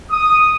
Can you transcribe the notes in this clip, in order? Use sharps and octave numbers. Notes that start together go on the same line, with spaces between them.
D#6